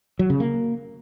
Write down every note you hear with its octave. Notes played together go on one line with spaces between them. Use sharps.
F#3
C#3
A#3